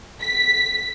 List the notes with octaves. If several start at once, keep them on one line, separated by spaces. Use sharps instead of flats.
B6